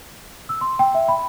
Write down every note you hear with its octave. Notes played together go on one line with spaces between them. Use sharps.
E6
C6
G5
E5
B5